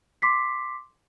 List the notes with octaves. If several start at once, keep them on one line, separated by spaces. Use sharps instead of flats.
C6 D6 B6 C7